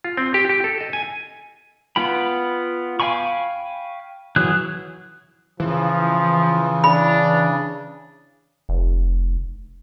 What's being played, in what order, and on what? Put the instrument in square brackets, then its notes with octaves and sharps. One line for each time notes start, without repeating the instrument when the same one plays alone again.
[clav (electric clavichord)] F4
C4
G4
G4
A4
D#5
G#5
[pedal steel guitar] B3 F4 G5 B5
F5 G5 G#5 B5 C#6
E3 F#3 G#4 F#6
[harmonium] C#3 [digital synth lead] E3 [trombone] F3
[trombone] D4 [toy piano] B5
[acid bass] F1